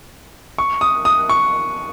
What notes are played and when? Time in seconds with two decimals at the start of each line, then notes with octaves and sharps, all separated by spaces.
0.58 C#6
0.81 D#6
1.05 D#6
1.29 C#6